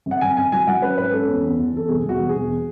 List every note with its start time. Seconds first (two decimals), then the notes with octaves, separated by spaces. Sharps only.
0.06 G#1
0.11 F#5
0.21 G#1 G#5
0.37 G#1 G#5
0.52 F#3 G#5
0.67 F#3 F#5
0.82 C#4 B4
0.98 G#2 B4
1.13 C#4 A4
1.28 E2
1.43 E2
1.58 E2
1.73 E2 A4
1.89 E1 G#4
2.03 E1
2.09 F#4
2.19 E1
2.29 G#4
2.34 E1